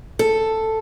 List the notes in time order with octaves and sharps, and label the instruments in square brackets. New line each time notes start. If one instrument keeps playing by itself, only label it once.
[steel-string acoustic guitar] A4